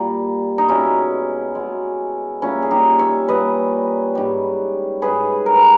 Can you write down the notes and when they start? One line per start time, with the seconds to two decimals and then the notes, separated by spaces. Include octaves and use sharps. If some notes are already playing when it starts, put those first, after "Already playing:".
Already playing: A#2 G3
0.58 D#4
0.68 B2 G#3 C#4 E4
1.55 B2 G#3
2.42 A#2 G3 C#4 E4
2.62 G#4
2.71 D#4 G4
2.99 C#5 E5
3.28 A#2 G3 B4 D#5
4.15 G#2 G3
5.02 G#2 G3 G#4 B4
5.46 A#4
5.56 B4